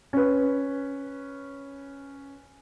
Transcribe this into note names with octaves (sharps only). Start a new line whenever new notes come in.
C#4 B4